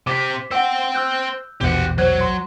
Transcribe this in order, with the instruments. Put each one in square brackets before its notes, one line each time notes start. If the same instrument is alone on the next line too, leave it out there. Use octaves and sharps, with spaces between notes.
[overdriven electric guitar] C3 G4 [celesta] D6 B6
[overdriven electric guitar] C5 G5 [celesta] F#5 E6
[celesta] E6 F#6 G6
[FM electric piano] A#1 E2 B2 [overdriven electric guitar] G4 F#5
[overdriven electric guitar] F#3 [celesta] C5 F#6 G#6
[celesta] C6